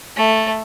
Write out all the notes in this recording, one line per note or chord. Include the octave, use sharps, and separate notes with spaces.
A3